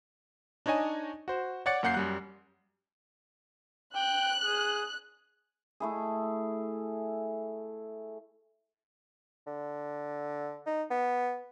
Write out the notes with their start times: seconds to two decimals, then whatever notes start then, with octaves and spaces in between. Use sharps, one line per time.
0.66 D4 D#4 C#5 D#5 G#5
1.28 F#4 C5
1.66 C#5 D5 F#5 A6 C#7
1.83 F#2 A#3 F#5 G6 C7
1.94 F#2 G3 F#6
3.95 G5 F#6
4.44 G#4
5.80 A3 E4 G#4
9.47 D3
10.67 D#4
10.91 B3